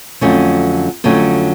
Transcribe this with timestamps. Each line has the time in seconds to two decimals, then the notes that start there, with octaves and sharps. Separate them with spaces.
0.21 F2 D3 F#3 A3 C#4
1.04 F2 D3 F#3 A3 C#4